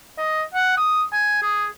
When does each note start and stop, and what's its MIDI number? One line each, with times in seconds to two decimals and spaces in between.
0.18 0.42 75
0.54 0.76 78
0.77 1.02 87
1.13 1.39 80
1.42 1.66 68